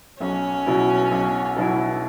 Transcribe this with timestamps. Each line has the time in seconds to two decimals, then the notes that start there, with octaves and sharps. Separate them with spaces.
0.20 B1 C#4
0.66 B2 F#3 E4
1.11 B1
1.56 B2 F#3 E4